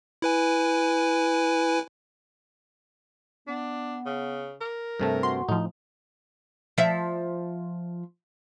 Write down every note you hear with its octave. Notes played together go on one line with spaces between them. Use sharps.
E4 B4 G#5
B3 D4
C#3
A#4
G2 C3 A3 A4
F#4 C6
A2 F3 D#4
F3 E5